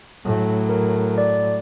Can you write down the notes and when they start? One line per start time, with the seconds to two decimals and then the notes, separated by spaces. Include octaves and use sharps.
0.25 A2 F#3
0.69 A#4
1.18 D5